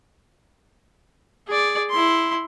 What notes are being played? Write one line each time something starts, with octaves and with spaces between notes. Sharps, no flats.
G#4 D5
E4 C6